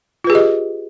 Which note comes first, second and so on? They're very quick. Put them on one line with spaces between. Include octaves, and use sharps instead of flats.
F4 B4 G#4 G4 D#5